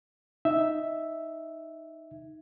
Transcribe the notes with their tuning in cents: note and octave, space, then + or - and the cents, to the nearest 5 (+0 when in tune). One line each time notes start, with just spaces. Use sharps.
D#4 +0 E5 +0